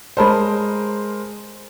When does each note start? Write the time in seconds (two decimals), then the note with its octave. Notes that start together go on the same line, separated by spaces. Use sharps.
0.17 G#3 A#4 C5 C#5 A5 B5